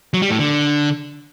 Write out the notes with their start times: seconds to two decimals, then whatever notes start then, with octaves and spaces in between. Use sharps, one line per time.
0.14 F#3
0.22 G3
0.31 A2
0.39 D3